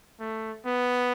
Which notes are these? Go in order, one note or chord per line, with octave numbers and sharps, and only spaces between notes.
A3
B3